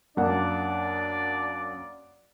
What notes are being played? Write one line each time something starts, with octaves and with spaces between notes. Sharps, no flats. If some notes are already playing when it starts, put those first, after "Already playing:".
F#2 A#3 D4 D5 F#5